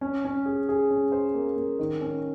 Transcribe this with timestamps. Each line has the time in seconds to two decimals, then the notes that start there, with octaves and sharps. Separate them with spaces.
0.01 C#4
0.25 C#4
0.46 G#4
0.69 G#4
0.90 C#4
1.12 C5
1.34 A#3
1.56 A#3
1.79 D#3
2.01 C#4